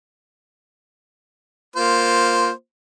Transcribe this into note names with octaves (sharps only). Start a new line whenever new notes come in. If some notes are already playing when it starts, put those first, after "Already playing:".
A#3 F4 C5